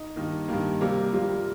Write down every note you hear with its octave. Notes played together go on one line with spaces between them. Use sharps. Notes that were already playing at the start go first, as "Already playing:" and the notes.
Already playing: D#4
G2 D#3 A#3
G2 D#3 A#3
C3 G3 A#3
C3 G3 A#3 F4